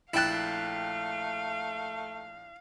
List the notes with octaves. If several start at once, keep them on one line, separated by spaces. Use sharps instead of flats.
A#1 A3 E4 F5 G5 A5 F#6